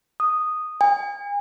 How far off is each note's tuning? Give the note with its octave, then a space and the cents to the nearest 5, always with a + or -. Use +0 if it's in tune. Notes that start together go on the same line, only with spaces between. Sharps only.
D#6 -5
G#5 -35